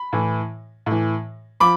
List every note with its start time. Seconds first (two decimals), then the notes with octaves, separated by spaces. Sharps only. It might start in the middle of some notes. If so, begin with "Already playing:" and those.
Already playing: B5
0.13 A2 E3
0.86 A2 E3
1.60 F3 B5 D6